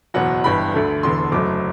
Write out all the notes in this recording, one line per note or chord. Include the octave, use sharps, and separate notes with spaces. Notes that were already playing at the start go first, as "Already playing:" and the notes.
F#1 E2 B2 F#3 F#5
G1 G2 E3 G3 B5
D2 D3 A3
E1 E2 D3 C6
C6
F#1 F#2 F#3 A3 D6